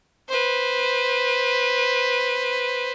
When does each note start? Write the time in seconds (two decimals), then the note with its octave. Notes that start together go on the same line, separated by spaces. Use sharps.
0.29 B4 C5